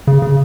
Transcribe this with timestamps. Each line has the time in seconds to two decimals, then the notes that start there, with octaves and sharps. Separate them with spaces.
0.07 C#3
0.22 C#3